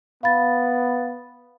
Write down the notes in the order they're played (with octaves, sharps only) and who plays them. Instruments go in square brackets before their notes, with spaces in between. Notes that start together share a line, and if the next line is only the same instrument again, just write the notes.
[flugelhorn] B3 [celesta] F5 B5 A6